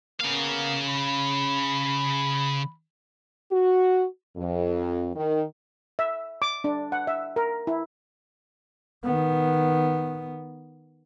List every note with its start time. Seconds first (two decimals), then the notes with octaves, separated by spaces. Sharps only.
0.21 C#3 A#3 B3 A#4 F5
0.86 B5
3.51 F#4
4.37 F2
5.15 D#3
5.99 E5
6.42 D6
6.64 D4
6.92 F#5
7.07 E5
7.36 A#4
7.67 E4
9.04 D#3 B3